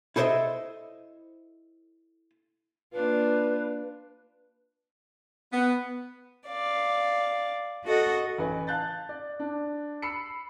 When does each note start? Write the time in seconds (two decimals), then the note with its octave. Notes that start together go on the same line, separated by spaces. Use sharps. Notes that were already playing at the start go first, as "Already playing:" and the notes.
0.16 E4 A4 C5 C#5 D#5 E5
2.93 A#3 D4 F4 B4
5.52 B3
6.47 D5 F5
7.84 F#4 A4 D#5 F#5
8.38 A1 C#4 B4 G#5
8.67 F5 A5 F#6 G6 A6
9.09 D5
9.40 D4
10.02 B5 E6 C7 C#7